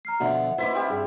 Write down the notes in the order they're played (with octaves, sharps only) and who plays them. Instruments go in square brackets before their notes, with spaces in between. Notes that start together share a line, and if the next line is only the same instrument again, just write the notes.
[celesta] A#5 F6 C7
[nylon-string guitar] B2 D3 F3 [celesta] F#4 E5 F#5
[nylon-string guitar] D#4 B4 C5 [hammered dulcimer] E4 B5 D6
[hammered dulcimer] G3 C4
[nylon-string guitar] G2 [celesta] G#4